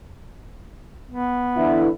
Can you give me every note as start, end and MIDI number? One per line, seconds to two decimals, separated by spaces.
1.11 1.94 59
1.57 1.88 50
1.57 1.88 52
1.57 1.88 64